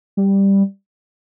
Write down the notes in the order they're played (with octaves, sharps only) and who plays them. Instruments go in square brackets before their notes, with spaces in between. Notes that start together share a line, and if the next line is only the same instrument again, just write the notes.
[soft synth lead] G3